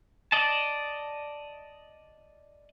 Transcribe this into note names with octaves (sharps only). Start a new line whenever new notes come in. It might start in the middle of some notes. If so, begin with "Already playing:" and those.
D5 D#5 A5